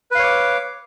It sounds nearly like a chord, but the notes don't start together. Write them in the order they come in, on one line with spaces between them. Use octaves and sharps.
B4 F5 C#5 D6